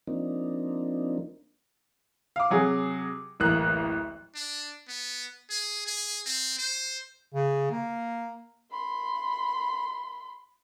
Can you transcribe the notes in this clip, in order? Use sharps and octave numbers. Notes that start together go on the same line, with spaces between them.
F3 A#3 C4 D4 D#4
F5 D6
C3 F#3 G#4
D1 A1 A#3 F#6
D4
B3
G#4
G#4
C4
C5
C#3
A#3
B5 C6